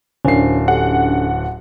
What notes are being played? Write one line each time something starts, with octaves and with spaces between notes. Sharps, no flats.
D1 C#4 D4 A#4 C5 G#5 C7
G4 A4 F#5 G#5